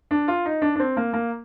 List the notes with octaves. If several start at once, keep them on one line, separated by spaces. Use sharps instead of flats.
D4
F4
D#4
D4
D4
C4
A#3
A#3